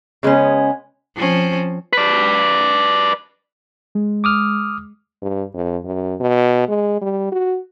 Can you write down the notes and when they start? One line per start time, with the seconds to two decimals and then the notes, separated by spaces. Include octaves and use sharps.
0.23 C#3 G#3 B3 C#4
1.16 F3 C4 C#4
1.93 B4 D5
3.95 G#3
4.24 D6 D#6 F6
5.23 G2
5.54 F2
5.85 F#2
6.21 B2
6.69 G#3
7.02 G3
7.32 F#4